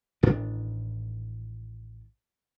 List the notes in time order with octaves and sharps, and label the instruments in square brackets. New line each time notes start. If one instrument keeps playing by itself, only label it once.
[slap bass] A1 A2 D#3 D4